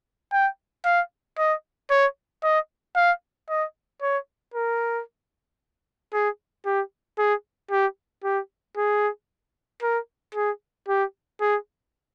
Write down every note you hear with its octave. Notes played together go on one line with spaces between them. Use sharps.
G5
F5
D#5
C#5
D#5
F5
D#5
C#5
A#4
G#4
G4
G#4
G4
G4
G#4
A#4
G#4
G4
G#4